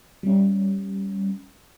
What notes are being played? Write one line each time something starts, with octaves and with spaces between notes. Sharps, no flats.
G3 C#4